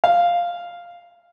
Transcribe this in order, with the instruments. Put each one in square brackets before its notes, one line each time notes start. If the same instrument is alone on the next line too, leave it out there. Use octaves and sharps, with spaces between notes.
[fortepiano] F5